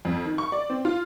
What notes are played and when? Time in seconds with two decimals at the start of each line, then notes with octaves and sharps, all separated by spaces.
0.05 F2
0.25 D#3
0.38 C#6
0.52 D5
0.70 C4
0.85 F4